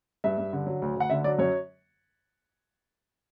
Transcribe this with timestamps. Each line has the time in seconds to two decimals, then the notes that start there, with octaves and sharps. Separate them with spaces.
0.24 G2 E5
0.38 G2
0.53 D3
0.66 F#3
0.82 D2
0.96 D2 F#5
1.10 D3 E5
1.24 F#3 D5
1.39 F#2 C#5